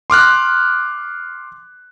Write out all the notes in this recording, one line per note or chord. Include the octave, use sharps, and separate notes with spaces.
C6 D6 F6 F#6